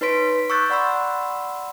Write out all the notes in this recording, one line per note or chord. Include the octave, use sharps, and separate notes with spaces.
D#4 B4 C#5 C6 B6 D7
B6
C#6 D6 E6 F#6 G6 A6
D5 F#5 B5 C6 E6